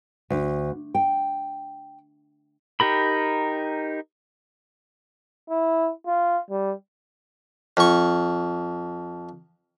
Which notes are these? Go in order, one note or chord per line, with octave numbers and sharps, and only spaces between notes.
D2
G5
D#4 G4 A#4 B5
E4
F4
G3
F2 C#6